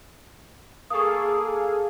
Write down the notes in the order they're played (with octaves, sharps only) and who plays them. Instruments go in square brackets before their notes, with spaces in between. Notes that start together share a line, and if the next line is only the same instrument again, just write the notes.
[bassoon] A#3 [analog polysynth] G#4 A4 F5 [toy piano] C#6 D#6